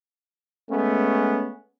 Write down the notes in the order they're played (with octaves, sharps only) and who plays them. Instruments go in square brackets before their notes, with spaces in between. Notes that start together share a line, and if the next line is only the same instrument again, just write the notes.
[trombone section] G#3 A3 B3 C#4